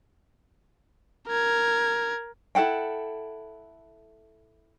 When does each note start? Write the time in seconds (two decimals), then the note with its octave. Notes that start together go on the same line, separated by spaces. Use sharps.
1.27 A#4 G#6
2.55 E4 A4 F#5 G5